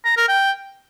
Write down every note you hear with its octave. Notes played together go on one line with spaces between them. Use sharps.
A#5
A#4
G5